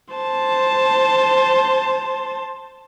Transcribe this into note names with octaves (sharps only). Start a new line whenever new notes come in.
C5 A5